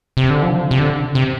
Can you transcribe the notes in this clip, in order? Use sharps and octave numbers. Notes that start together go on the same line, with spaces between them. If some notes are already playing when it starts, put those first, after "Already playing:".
C3
D3
F3
C3
D3
C3